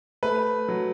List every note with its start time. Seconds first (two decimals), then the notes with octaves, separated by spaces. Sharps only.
0.23 A3 B4
0.68 F#3